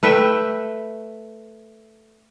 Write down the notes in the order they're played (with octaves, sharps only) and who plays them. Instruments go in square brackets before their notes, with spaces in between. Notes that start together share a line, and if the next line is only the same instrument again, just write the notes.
[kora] A3 B4 E5 G5